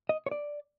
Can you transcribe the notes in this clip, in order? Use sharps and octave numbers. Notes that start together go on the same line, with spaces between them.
D#5
C#5
D5